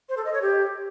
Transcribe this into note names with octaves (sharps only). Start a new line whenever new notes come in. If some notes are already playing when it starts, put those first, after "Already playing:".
C5
A4
D#5
C#5
G4